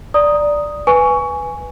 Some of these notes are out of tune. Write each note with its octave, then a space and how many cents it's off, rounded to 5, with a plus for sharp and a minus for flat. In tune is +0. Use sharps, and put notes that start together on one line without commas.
D5 +0 A#5 +0 D#6 +0
B4 +0 G#5 +0 C#6 +20